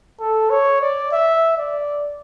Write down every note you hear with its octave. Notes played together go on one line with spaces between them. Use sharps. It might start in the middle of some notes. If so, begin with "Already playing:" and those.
A4
C#5
D5
E5
D5